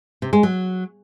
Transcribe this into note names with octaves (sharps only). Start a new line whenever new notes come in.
C3
G#3
F#3